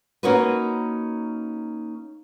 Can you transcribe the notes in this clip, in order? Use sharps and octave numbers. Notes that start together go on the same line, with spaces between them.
A#3 C#4 D#4 F#4 A#4 B4